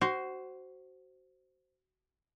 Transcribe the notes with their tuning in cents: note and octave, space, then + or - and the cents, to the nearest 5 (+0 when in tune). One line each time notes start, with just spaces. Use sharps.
F#4 +20 C5 +0